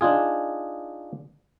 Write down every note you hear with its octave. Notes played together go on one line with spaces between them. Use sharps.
D4 D#4 F4 G#4